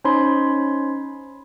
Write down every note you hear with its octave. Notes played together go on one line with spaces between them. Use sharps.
C#4 D#4 C5 C#5 B5 C6